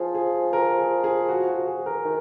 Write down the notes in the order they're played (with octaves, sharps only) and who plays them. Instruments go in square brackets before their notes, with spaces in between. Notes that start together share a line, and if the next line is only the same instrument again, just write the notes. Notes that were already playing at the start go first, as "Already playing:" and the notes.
Already playing: [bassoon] F3 [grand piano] G#4
[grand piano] G#4
A#4
G#4
G#4
F#4
F#4
G#4
A#4
[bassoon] D#3